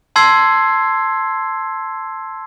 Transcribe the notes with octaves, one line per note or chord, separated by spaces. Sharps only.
A5 C6 E6 G#6 C7